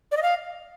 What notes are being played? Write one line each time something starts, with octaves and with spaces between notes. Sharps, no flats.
D5
D#5
F5